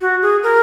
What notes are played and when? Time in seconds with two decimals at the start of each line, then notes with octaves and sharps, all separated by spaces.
0.01 F#4
0.22 G#4
0.43 A#4